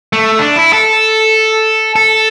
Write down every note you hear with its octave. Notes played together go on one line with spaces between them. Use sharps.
A3
D4
E4
A4
A4